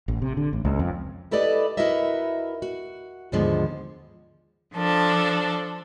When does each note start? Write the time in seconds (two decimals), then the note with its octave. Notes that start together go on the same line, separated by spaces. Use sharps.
0.08 A1
0.22 C3
0.37 D3
0.53 A1
0.65 C#2
0.79 F2
1.31 E4 G4 A4 B4 D5 D#5
1.77 E4 F#4 A#4 B4 D#5 E5
2.62 F#4
3.32 D#2 G#2 D3 F3 G#3 B3
4.73 F3 D4 A4